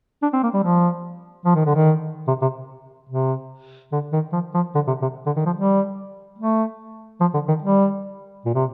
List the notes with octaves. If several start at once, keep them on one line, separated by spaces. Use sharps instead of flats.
D4
C4
A#3
G3
F3
F3
D#3
D3
D#3
C3
C3
C3
D3
D#3
F3
F3
D3
C3
C3
D3
D#3
F3
G3
A3
F3
D3
D#3
G3
A#2
C3